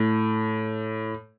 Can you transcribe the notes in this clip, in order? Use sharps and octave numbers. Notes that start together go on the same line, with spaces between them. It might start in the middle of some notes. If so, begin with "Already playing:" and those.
Already playing: A2